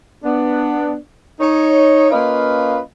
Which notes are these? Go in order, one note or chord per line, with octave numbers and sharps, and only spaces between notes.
B3 D4
D#4 C#5
A#3 C#4 F4 B4 D#5 F5